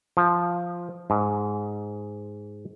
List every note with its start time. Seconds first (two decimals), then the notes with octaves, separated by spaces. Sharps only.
0.17 F3
1.10 G#2